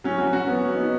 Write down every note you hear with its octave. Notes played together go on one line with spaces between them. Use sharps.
F#3 C#4
C#4 F#4
F#3
C#4 F#4
F#3 B3
C#4
F#3
B3 D#4